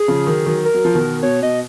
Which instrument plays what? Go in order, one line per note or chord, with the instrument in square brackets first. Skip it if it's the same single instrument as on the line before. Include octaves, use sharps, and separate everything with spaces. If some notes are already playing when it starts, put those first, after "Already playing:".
Already playing: [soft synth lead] G#4
[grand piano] C#3 F3
D#3 F#3
D#3 F#3
[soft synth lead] A#4
[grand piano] F#3
F3
B2 D#3
[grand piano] B2 [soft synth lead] C#5
[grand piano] B2 [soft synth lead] D#5